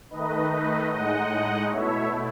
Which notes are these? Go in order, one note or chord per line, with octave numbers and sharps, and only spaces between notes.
D#3 A3 D#4 B4 D#5
B4 D#5
A2 G#3 D#4 D#5 F#5
B2 A3 E4 C#5 E5